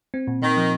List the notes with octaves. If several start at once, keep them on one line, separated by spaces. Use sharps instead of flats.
C4
A#2
A#2 D#3
F3